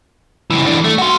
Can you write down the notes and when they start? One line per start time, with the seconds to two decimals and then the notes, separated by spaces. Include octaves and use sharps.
0.50 C#2 E3
0.66 E3 D4
0.84 A3
0.98 F#4 C6